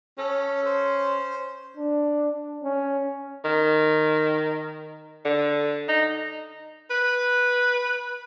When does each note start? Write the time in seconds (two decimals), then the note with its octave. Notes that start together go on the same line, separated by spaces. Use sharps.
0.18 C#4 A4
0.66 C5
1.77 D4
2.64 C#4
3.45 D#3
5.25 D3
5.89 D#4
6.90 B4